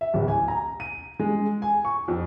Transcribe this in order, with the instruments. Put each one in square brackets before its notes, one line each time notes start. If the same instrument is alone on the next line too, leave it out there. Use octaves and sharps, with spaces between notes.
[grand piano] E5
D1
G#5
A#5
D#7
G#3
G#5
C#6
F2